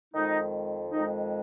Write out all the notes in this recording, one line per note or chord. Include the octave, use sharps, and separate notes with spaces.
F2 D#3 G#3 D#4
F2 D#3 G#3 D#4